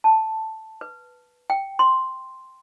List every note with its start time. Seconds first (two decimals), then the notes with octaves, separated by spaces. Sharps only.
0.04 A5
0.81 B4
1.50 G5
1.79 C6